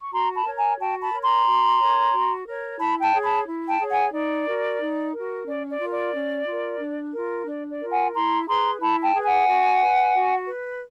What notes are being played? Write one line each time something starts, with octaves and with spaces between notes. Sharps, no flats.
C#6
F#4 A#5 C6
A5 B5
A#4 C#5
G#5 A#5
F#4 G5 A5
A5 B5
A#4 C#5
A#5 C6
F#4
A#4 C#5
F#4
A#4 C#5
E4 A5 B5
G5 A5
G#4 C#5
A5 B5
E4
G5 A5
G#4 C#5
F#5 G#5
D#4 D5
F#4 A#4
D#4
F#4 A#4
C#4 D5
D5
F4 A#4
D5
C#4
F4 A#4
D4
F4 A#4
D4 D5
D5
F4 A#4
F#5 G#5
E4 A#5 C6
G#4 B4 A#5 C6
E4 A5 B5
G5 A5
G#4 B4
F#5 G#5
F#4
B4
F#4
B4